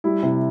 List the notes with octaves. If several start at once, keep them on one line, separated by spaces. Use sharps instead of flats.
G3 E4
C3 E4